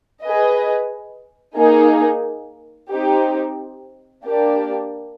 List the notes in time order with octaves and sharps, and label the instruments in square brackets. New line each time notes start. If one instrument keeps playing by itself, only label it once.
[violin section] G#4 B4 D#5
A#3 D#4 G#4
C4 D#4 G4
A#3 D4 G4 A#4 D5